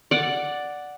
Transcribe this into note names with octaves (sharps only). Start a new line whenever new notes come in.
D5 F#5